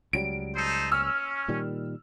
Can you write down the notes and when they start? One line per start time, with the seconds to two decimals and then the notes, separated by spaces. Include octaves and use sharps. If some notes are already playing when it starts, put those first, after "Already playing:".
0.13 C#2 F#3 G3 D7
0.56 D#4 A4 C5
0.92 C#4 E6 F6
1.48 A#2 D#3 G3